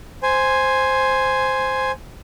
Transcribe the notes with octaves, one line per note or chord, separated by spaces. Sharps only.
C5 G#5